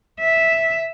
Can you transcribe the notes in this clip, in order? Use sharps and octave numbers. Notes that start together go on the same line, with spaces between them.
E5